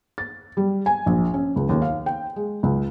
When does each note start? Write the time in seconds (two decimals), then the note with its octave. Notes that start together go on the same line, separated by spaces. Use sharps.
0.18 A6
0.57 G3
0.86 G#5
1.06 A#1
1.34 C#4
1.56 C#2
1.69 D#2
1.82 F5
2.06 G5
2.36 G#3
2.63 C#2